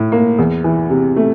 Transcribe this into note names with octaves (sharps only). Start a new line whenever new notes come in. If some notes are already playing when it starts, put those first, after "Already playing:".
Already playing: A2
A#3
E2
E3
C3
A3